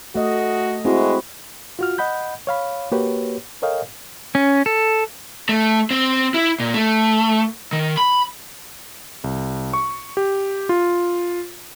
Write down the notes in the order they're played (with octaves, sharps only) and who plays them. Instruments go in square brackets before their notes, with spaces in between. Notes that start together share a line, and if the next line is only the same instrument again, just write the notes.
[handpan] A3 D#5 [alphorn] F#4
[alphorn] G#3 [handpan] C4 E4 F#4
[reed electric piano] F4 F#4 F6
D#5 F#5 B5 G6
C#5 F5 B5
A#3 F#4 G4 B4 C#5
A4 A#4 C#5 D#5 F5 G5
[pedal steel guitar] C#4
A4
[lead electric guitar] A3
C4
E4
A#2
A3
D#3
B5
[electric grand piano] C2
C#6
G4
F4